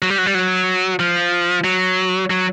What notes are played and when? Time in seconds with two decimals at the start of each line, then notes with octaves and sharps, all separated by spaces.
0.02 F#3
0.10 G3
0.18 F#3
0.26 G3
0.35 F#3
1.00 F3
1.64 F#3
2.30 F#3